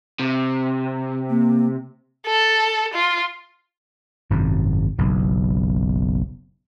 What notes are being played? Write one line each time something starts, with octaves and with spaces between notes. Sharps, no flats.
C3
A#3
A4
F4
G#1 F#2 C3
F#1 B1 B2